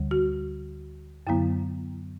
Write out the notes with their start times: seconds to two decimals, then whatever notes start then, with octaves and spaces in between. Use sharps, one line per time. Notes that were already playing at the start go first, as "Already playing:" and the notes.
Already playing: D2 D3 G3
0.11 F#4
1.27 F#2 D3 F#3 B3 E4